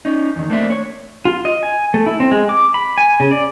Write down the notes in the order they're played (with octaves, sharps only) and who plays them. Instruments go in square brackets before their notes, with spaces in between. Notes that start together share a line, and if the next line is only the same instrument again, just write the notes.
[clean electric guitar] C#4 D#4
E2 D#3
A3 A#3 C4 D4 E4 E5
C#5
[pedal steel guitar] F4
D#5
G#5
A3
E4
C4
G#3
D6
B5
G#5
C#3
D5